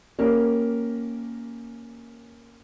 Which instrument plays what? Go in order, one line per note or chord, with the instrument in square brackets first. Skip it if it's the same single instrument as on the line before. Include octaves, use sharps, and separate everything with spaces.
[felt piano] A#3 C#4 G4 A#4